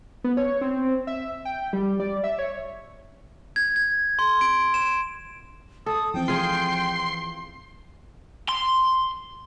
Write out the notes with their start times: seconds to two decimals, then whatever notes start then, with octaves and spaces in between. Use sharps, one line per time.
0.24 B3
0.37 C#5
0.61 C4
1.07 E5
1.45 G5
1.73 G3
2.00 D5
2.24 E5
2.39 C#5
3.56 G#6
3.76 G#6
4.19 C6
4.41 D7
4.74 E7
5.86 A4 D#6
6.14 E3 F3 C4 G5
6.28 F4 G#4 C6
8.49 C6